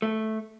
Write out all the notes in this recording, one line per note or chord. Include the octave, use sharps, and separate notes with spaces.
A3